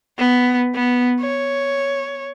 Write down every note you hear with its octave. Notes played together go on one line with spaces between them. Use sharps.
B3
B3
C#5